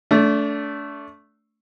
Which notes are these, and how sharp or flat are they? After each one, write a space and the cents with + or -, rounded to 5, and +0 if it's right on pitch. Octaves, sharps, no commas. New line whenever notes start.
A3 +0 D4 -35